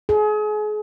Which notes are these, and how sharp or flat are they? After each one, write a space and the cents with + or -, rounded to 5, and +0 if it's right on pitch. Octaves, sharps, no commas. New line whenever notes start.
G#4 +35